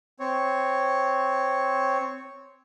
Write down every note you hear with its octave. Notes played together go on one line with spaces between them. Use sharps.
C4 C#5